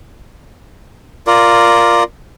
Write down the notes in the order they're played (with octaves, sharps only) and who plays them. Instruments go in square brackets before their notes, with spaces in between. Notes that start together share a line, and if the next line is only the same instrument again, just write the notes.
[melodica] F4 A#4 D5